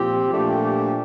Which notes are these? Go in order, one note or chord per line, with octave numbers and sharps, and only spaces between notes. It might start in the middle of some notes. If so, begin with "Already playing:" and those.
Already playing: A#2 F3 C4 G4
A#2 F3 A3 D4 G4